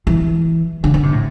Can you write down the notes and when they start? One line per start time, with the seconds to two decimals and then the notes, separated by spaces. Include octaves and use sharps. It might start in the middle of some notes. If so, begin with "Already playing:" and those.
0.07 E3
0.84 D3
0.94 D3
1.03 C3
1.13 A2